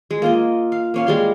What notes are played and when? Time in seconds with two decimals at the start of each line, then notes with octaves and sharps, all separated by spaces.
0.11 G#3
0.22 A#3 F4 D#5
0.72 F5
0.94 A#3 C#4 F5
1.07 G3 G#3 C6